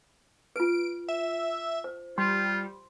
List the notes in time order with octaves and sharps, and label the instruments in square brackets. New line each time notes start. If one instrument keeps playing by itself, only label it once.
[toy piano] F4 B4 [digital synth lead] D7
[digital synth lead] E5
[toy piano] C5
[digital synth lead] G3 [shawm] F4 [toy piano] C6